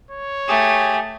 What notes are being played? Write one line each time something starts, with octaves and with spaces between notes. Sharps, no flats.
C#5
A3 G4 G#4